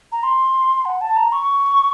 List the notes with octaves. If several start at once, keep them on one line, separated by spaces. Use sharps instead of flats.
A#5
C6
F#5
A5
A#5
C#6